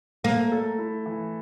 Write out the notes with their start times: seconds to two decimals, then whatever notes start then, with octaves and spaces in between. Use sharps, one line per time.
0.24 A3 A#3
0.52 A4
0.78 E4
1.06 E3